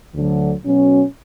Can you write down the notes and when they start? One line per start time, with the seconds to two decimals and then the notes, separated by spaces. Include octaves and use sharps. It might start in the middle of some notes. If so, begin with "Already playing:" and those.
0.14 D2 D3 F#3
0.64 B2 F#3 C#4